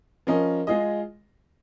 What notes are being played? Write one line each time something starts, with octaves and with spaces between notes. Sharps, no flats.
F3 C#4 A#4 D#5
G#3 F4 G#4 D#5